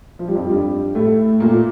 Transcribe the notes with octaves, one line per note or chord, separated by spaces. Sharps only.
F3
G3
F2 F3
G2 G3
A2 A3
A#2 A#3